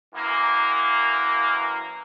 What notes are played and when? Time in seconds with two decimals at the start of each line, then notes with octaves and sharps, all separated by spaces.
0.13 F#2 E3 A#3